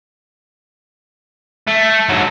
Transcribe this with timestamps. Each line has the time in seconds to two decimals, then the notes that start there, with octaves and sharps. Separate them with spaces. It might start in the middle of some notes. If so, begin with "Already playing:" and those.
1.67 A3
2.09 G#2 F#3